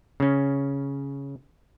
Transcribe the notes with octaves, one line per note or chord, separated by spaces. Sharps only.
C#3 C#4